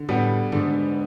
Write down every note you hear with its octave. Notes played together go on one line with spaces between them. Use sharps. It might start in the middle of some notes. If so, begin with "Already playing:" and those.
Already playing: D3
A2 G3 B3
G#2 D3